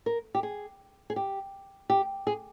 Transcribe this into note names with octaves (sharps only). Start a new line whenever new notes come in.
A#4
G4
G#4
G#4
G4
G4
G#4